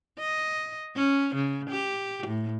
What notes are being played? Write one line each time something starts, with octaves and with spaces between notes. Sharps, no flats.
D#5
C#4
C#3
G4
A2